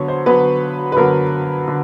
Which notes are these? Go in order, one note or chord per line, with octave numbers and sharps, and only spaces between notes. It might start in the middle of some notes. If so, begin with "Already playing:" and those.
Already playing: D3 F#3 B3 C#5
C5
D3 F#3 B3 B4
B4
D3 F#3 B3 A#4
D3